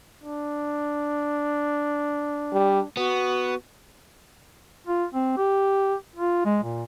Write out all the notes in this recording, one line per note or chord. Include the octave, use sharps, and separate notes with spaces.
D4
G3
B3 F#4
F4
C4
G4
F4
G#3
A#2